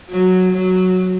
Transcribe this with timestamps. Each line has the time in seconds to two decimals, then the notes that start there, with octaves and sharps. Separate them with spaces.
0.10 F#3
0.53 F#3